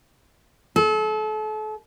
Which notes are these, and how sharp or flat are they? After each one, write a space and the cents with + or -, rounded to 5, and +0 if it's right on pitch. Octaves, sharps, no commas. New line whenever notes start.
A4 -35